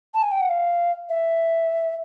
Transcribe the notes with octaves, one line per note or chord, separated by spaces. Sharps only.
A5
G#5
G5
F#5
F5
E5